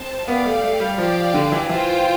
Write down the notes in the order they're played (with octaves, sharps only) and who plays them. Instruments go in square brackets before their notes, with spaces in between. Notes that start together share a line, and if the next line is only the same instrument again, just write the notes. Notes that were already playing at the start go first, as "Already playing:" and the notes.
Already playing: [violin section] C4 C5 A5
[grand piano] B3 [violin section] G4 D5 F5
[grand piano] A3
A3
G3
[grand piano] F3 [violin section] G4 D5 F5
[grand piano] D3
E3
[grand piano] E3 [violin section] F4 C5 G5